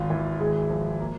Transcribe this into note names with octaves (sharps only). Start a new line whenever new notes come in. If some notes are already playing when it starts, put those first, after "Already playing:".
Already playing: G#1 F4
E3
G#1 G#3 G#4
F3
A#3